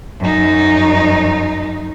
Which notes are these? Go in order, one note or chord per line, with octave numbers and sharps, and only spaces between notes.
F#2 D#4